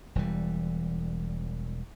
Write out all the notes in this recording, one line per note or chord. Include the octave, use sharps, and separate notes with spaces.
E1 E3 G3